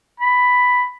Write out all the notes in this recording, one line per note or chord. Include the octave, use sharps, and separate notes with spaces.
B5